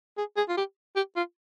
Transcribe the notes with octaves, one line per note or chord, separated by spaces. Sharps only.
G#4
G#4
F4
G4
G4
F4